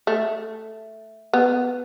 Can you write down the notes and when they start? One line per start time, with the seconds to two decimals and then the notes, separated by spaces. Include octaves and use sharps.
0.07 A3
1.33 B3